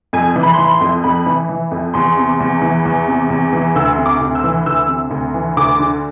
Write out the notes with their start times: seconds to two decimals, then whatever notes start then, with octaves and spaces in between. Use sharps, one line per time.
0.13 F2 G#5
0.36 E3
0.43 B5
0.53 E3 C6
0.64 B5
0.74 C6
0.81 F2
1.04 F2 B5
1.26 E3
1.49 E3
1.71 F2
1.94 E2 C6
2.17 C3
2.40 E2
2.62 E3
2.85 E2
3.08 C3
3.30 E2
3.53 E3
3.76 D2 E6
3.97 C3
4.06 D6
4.21 D2
4.35 E6
4.44 E3
4.66 D2 E6
4.88 C3
5.11 D2
5.34 E3
5.57 D2 D6
5.79 D3